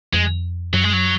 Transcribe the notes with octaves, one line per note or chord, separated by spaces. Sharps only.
F2 G#3
F#2 F#3
G#3
F#3